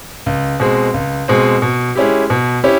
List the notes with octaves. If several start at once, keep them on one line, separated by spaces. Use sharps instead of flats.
C#2
B2 G#3 C4
C#2
B2 G#3 C4
B2
G#3 C#4 E4 G4
B2
C#4 E4 G4